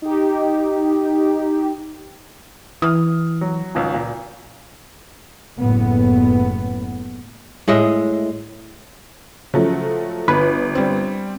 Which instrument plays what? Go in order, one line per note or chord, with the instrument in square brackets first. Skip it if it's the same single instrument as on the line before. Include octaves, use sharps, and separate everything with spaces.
[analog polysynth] D#4 G4
[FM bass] E3 [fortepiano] D#6 F6
[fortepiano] F#3
G#1 C#2
A#2
[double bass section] F#1 A2 B3
[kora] A2 G#3 D#5 E5
[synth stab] C#3 [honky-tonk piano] F3 F#3 A3
[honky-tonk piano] G1 [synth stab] B4
[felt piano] G3 C4